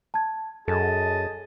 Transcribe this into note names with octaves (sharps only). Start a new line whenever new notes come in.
A5 G#6
F#2 G#4 A4 D#5 G#5 A5